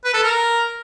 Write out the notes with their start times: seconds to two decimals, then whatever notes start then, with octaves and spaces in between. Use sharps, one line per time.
0.04 B4
0.14 A4
0.23 A#4